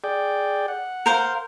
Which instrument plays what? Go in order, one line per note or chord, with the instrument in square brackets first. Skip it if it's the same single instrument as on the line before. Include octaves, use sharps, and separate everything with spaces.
[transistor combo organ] G#4 D5 G5
F#5
[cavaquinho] A#4 C5 F5